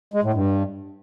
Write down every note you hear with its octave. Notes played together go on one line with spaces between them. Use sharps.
G#3
A2
G2